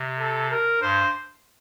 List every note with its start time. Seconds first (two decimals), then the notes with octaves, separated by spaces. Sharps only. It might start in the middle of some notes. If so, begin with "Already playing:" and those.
Already playing: C3
0.19 A4
0.50 A#4
0.82 G2 C5